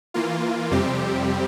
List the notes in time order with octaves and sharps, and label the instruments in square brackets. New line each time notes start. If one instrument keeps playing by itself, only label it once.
[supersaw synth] E3 A#3 F4
F2 C3 G3 C4 G4